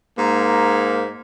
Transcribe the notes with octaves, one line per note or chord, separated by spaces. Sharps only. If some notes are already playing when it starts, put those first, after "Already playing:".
G#2 A#3